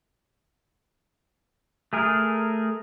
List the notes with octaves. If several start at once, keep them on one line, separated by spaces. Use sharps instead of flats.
A3 G#4 A#4